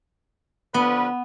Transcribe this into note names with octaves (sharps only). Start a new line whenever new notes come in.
D3 F3 B3 B4